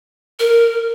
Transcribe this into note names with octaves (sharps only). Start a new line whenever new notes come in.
A#4